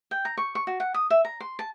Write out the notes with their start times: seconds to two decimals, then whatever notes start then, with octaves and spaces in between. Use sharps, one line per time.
0.11 G5
0.25 A#5
0.37 C#6
0.55 C#6
0.67 F#4
0.80 F#5
0.94 D#6
1.10 E5
1.25 A#5
1.40 C6
1.59 A5